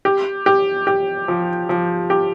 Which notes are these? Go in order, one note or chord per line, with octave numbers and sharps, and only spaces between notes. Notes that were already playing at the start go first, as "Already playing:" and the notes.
G4
G4
G4
F3
F3
G4